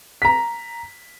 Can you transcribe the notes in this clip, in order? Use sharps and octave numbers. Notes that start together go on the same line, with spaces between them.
A#5 B6